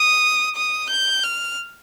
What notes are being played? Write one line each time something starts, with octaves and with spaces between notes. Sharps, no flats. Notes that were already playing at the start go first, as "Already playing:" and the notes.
Already playing: D#6
D#6
G6
F6